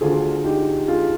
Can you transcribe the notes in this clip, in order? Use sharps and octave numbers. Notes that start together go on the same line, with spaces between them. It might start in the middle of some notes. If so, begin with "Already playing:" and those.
D2 D3 F4 G#4
D#4 G4
F4 G#4